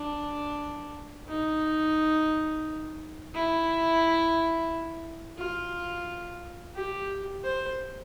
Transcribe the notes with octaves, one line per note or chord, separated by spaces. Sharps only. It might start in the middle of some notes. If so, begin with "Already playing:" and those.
Already playing: D4
D#4
E4
F4
G4
C5